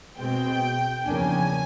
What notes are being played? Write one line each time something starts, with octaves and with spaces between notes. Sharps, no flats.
B2 G#3 C4 G5
E2 C#3 F3 A#3 D4 G#5